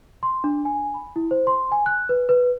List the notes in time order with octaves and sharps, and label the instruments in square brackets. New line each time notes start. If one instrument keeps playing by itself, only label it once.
[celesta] C6
D4
G#5
B5
E4
C5
C6
G#5
F#6
B4
B4